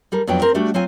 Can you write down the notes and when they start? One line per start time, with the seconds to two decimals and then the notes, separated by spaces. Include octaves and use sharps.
0.12 G3 A4 A#4
0.27 F2 F#3 B3 D4 G5
0.42 C4 A#4
0.54 G3 A3 D4 F#4
0.74 F#3 C4 F4 G#5